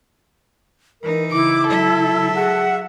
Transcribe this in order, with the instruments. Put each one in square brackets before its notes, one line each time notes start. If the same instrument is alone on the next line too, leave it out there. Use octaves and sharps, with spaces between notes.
[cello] E3 D#4 [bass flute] A#4
[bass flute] C#3 [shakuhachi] E4 [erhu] D6
[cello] F#3 E5 [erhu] A4
[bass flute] G#4 [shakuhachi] F#5